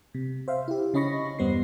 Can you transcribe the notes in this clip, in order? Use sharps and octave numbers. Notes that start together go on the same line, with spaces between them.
C3
C5 E5 F5
E4 G4
C#3 C#4 D#5 B5 C#6 A#6
E2 G2 G3 B3 C5 C7